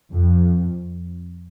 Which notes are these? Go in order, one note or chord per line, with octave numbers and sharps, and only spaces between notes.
F2